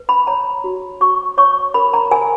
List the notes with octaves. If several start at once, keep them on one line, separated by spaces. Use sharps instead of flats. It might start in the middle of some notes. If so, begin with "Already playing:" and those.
Already playing: B4
B5
C#5 A#5
F#4
F#4 C#6
C#5 C#6
A#4 B5
A#5
A#4 G#5